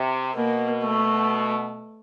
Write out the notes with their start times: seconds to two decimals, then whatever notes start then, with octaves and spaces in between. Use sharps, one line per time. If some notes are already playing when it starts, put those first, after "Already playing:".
Already playing: C3
0.34 B2 A#3
0.83 A3